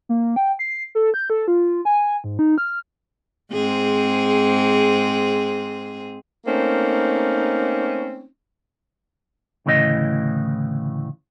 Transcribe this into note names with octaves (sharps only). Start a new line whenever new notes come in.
A#3
G5
C7
A4
G6
A4
F4
G#5
G#2
D#4
F6
G#2 C4 G#4
A3 A#3 C4 C#4 D#4
D2 A2 C#3 E3 D#5